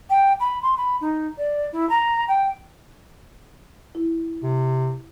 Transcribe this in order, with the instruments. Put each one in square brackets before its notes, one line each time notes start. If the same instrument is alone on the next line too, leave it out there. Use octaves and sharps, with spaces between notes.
[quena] G5
B5
C6
B5
D#4
D5
E4
A#5
G5
[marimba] E4
[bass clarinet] C3